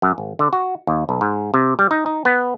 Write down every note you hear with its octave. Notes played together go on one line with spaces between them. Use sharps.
F#2
G#1
D3
F#4
D#2
B1
G#2
C3
G3
D#4
D#4
B3